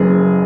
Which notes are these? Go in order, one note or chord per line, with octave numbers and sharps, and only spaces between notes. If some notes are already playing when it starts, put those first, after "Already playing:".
Already playing: F#1 F#2 C#3 E3 G#4